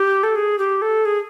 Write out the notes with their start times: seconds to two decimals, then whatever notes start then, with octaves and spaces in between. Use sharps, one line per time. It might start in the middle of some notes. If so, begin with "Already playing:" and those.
Already playing: G4
0.23 A4
0.36 G#4
0.59 G4
0.82 A4
1.05 G#4